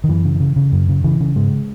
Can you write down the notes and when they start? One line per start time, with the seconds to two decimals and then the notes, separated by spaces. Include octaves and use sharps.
0.04 D#3
0.08 F#2 E3
0.25 C#3
0.40 C#3
0.56 C#3
0.72 F#2
0.89 C#3
1.04 C#3 E3
1.20 C#3
1.36 G#2 G#3